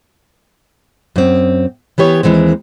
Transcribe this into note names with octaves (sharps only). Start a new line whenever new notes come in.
F#2 C4
E3 B3 G4 C#5
D#2 G#2 E3 G#3 C4